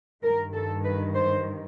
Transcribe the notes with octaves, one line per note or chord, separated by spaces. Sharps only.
G2 D#3 A#4
A4
B4
C5